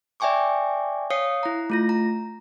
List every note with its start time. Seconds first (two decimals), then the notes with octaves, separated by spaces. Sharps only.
0.20 D5 E5 G5 G#5 C#6 D6
1.10 C#5 F5 D#6 C7 C#7
1.43 E4 A#5
1.70 A3 F4 A#6
1.89 A#5